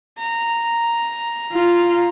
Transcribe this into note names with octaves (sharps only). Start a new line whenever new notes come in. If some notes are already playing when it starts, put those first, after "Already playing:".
A#5
F4